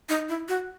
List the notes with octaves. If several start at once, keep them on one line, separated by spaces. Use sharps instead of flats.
D#4
E4
F#4